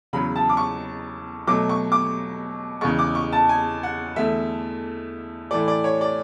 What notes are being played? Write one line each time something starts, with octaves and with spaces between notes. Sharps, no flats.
E2 C#3 F#3 B5
A5
D6
C#6
B2 F#3 A3 D6
C#6
D6
E2 C#3 G#3 C#6
D6
C#6
A5
G#5
F#5
E2 D3 A3 E5
A2 E3 A3 D5
D5
C#5
D5